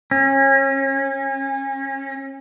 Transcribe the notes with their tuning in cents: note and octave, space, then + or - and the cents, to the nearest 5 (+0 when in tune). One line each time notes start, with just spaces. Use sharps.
C#4 -35